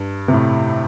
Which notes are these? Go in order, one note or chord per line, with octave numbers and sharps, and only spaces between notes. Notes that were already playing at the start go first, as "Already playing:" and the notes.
Already playing: G2
C3
A2